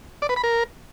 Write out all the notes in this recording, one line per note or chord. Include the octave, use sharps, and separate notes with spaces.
D5
B4
B5
A#4